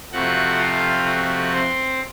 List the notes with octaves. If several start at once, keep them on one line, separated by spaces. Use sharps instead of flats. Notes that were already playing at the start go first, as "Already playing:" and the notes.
F2 C3 F3 A3 F#4 F#5
F4 F5
F#4 F#5
C4 C5